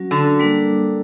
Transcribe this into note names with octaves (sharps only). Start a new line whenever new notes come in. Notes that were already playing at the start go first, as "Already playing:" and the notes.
Already playing: F#3 C#4 F#4
D3
G3 A#3 D4 A#4